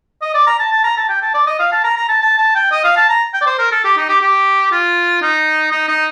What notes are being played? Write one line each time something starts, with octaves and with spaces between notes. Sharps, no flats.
D#5
D5
A#5
A5
A5
A#5
A5
G5
A5
D5
D#5
F5
A5
A#5
A#5
A5
A5
A5
G5
D#5
F5
A5
A#5
G5
D5
C5
A#4
A4
G4
D#4
G4
G4
F4
D#4
D#4
D#4